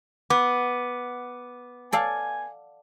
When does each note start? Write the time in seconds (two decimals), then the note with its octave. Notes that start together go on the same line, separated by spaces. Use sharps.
0.30 B3 D6
1.93 A4 D5 F5 G#5